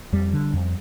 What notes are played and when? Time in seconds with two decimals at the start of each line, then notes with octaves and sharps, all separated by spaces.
0.13 F2 G3
0.33 D3
0.53 F2